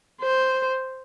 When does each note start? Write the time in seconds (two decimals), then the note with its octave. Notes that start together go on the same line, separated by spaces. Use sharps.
0.21 C5